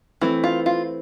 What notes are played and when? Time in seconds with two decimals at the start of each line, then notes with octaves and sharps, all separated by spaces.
0.21 E3 A3 C4
0.44 F4
0.66 F4